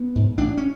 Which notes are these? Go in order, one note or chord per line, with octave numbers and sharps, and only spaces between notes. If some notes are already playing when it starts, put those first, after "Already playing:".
Already playing: B3
G#2
A1 D4
C#4